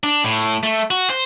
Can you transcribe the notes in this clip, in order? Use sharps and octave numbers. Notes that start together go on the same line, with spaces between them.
D4
A2
A3
F#4
C5